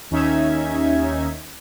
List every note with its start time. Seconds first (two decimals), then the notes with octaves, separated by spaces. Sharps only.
0.11 D#2 C#4 D#4 E5 G#6